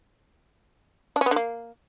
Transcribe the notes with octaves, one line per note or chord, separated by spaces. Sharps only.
D4
C#4
B3
D3
A#3